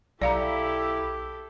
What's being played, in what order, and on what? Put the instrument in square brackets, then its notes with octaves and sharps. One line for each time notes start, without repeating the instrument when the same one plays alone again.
[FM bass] B1 [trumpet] E4 [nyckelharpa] G4 A4 [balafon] D5 F5 A#5